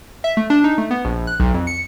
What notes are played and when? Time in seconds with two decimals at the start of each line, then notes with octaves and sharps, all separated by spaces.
0.24 E5
0.37 A3
0.50 D4
0.64 D#4
0.78 A3
0.91 B3
1.05 A#1
1.27 F#6
1.40 B1
1.54 F2
1.67 C#7